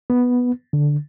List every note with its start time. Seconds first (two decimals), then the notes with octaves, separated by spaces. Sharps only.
0.10 B3
0.73 D3